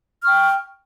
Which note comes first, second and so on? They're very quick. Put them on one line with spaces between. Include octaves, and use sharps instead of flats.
F6 C#6 G5